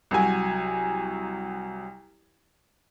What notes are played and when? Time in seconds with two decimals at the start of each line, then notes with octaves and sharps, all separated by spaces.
0.11 C2 F#3 G#5